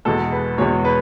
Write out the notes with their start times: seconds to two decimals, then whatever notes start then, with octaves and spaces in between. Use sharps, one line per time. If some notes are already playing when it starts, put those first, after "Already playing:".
0.05 E2 B2 G#3 A4
0.32 B4
0.58 E2 B2 G#3 C#5
0.85 B4